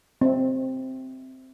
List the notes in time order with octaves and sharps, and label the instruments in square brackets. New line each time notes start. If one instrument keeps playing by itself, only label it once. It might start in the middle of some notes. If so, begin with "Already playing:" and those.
[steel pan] C4 E5